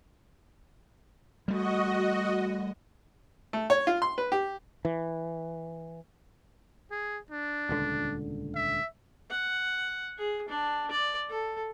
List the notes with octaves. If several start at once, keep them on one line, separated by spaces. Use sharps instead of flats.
G3 A3 F#4 D#5
A3
C#5
F4
C6
B4
G4
E3
G#4
D4
D#1 C#2 D3
E5
F#5
G#4
D4
D5
A4